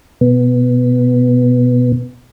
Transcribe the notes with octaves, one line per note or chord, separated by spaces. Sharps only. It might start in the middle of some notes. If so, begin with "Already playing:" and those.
B2 B3